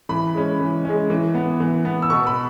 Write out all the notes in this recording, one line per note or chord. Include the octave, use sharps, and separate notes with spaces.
E3 B5
G#3 C#4
E3
G#3 C#4
E3
B3
E3
B3
E6
B2 C#6
B5